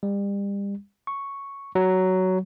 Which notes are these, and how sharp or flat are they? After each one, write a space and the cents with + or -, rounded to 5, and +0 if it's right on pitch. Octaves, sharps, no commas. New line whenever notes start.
G3 +35
C#6 +0
F#3 +10